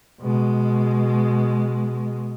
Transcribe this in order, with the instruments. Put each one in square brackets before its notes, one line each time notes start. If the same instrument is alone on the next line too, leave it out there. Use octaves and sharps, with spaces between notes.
[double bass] B2 G#3